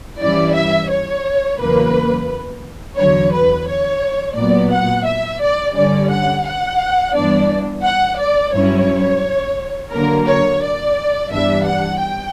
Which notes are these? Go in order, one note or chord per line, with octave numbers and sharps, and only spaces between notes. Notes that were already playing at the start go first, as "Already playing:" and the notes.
G2 E3 G3 C#4 E4 D5
E5
C#5
E2 C#3 F#3 A#3 B4
E2 D3 F#3 C#5
B4
C#5
A#2 F#3 B3 D5
F#5
E5
D5
G2 D3 G3 C#4 D5
F#5
F#5
G2 E3 B3 D4 D5
F#5
D5
G2 F#3 C#4 E4 C#5
D3 F#3 A#3 A#4
C#5
D5
G2 E3 G3 B3 D4 E5
F#5
G5